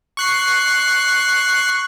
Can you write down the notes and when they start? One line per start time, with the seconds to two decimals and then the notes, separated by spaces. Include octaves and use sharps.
0.17 C#6 F#6 C7